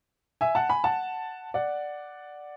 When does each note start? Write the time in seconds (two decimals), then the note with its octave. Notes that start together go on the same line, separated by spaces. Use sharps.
0.41 E5 G#5
0.55 F#5 A5
0.69 G#5 B5
0.84 F#5 A5
1.54 D5 F#5